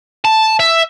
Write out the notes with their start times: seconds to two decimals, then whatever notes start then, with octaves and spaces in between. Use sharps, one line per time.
0.25 A5
0.60 E5